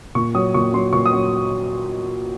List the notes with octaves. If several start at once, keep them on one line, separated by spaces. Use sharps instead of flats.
A#2 C#6
F#3 D#6
A#2 C#6
F#3 C6
A#2 C#6
D#6
F#3